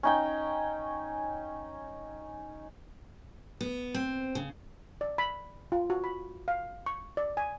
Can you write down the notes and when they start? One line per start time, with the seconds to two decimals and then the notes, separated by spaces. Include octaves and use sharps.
0.03 C#4 D#4 G5
3.61 B3
3.94 C4
4.35 C#3
5.01 D5
5.18 B5
5.72 F4
5.90 F#4
6.04 B5
6.48 F5
6.86 C#6
7.17 D5
7.37 G#5